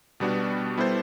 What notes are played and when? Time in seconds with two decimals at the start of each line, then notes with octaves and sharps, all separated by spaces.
0.20 B2 G3 B3 D4 F#4
0.77 G3 B3 E4 A4 C5